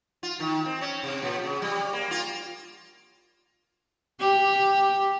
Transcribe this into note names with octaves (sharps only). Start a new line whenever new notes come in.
F4
D#3
C4
C#4
C3
A#2
C#3
G3
A#3
F4
G4